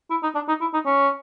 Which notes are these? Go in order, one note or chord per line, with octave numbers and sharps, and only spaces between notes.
E4
D#4
D4
D#4
E4
D#4
C#4